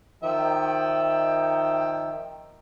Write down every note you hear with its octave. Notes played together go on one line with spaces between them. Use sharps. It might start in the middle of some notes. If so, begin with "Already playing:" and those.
D#3 F3 E5 G5